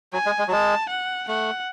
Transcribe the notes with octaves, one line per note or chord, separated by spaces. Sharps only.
F#3 G#5
G#3
G#3
F#3
G#3 A5
F#5
A3 F#5